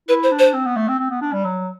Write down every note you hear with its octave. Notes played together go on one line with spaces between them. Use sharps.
E4 B4
C5
D4
C5
C4
B3
A3
C4
C4
B3
D4
G3
F#3